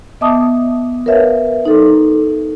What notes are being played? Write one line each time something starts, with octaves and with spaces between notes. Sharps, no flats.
B3 D#5 E5 A5 D6 D#6
A#4 B4 C#5 E5 F5
D#4 A4